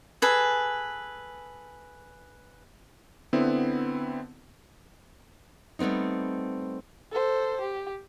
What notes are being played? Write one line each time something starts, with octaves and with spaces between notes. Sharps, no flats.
G#4 A4 B4 G#5
D3 B3 C4 E4
G3 A3 B3 C4 D#4
A4 C5
G4